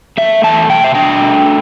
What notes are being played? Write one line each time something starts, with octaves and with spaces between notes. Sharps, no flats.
A3 E5
E2 A5
B2 G5
E5
D4 G5
A3